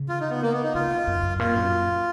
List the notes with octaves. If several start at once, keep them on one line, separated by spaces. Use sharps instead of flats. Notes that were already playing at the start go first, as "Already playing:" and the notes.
Already playing: C#3
F4
D#4
B3
A#3
B3
D#4
C#3 F4
B2
F#2
F#2
A#2 F4
F#2